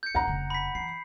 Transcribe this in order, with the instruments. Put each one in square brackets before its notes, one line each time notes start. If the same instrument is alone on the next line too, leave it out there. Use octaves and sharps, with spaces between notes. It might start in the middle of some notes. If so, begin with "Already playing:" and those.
[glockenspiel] G6 C#7
[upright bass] E2 B2 [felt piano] F#5 A#5
[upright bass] F1 C#3
[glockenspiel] B5 B6
[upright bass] E3 [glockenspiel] C7